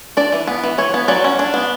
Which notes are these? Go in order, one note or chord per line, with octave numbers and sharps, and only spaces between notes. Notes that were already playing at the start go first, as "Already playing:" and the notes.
D4 D5
E3
B3
E3
E3 C#5
B3
F#3 D5
C#4
D4
B3